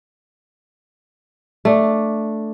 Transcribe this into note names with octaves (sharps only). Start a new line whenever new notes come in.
A3 D4